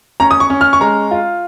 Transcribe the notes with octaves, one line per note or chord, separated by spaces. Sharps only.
C#4 A#5
D#6
C#6
C#4
F6
C#6
G#3 A#5
F4